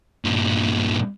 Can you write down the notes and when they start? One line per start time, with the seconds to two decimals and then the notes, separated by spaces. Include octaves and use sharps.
0.24 G2 A#2